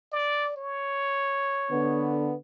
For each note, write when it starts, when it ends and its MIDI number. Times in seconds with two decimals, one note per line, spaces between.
0.12 0.54 74
0.56 2.16 73
1.71 2.33 50
1.71 2.33 59